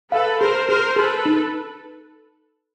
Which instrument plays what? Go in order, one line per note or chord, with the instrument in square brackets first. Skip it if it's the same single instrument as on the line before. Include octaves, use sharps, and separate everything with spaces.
[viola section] A4 B4 [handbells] F5
[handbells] G#4 [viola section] A#4 C5
[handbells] G#4 [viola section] A#4 C5
[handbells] G#4 [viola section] A4 B4
[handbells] D#4